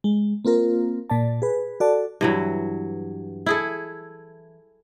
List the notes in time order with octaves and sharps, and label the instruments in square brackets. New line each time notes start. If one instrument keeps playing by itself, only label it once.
[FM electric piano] G#3
A#3 C4 F4 A#4
A#2 D5 A5
G#4 B4
F#4 A4 D5 A5
[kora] G2 E3 F#3
E4 G#4 A4